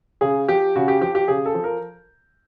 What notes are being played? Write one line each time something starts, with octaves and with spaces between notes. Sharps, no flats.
C#3 G#4
F3 G4
C#3 F#4
G4
F3 G4
G4
C#3 G#4
A4
F3
A#4